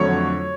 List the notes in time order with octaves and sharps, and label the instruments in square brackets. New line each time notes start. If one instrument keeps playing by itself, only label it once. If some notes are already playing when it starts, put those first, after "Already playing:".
Already playing: [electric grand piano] F2 D3 F#3 A3 C#5 C#6